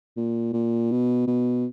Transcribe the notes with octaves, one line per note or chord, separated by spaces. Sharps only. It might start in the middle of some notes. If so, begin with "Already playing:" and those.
A#2
A#2
B2
B2